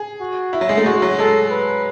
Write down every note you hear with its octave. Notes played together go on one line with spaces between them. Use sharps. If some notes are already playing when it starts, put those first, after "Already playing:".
Already playing: G#4
F#4
E4
F#3
G#3
A3
G#3 F#4
F#3
G#3 A4
B4